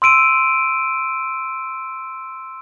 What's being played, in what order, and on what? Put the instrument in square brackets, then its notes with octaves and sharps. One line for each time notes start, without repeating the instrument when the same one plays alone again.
[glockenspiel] C6 E6 D7 D#7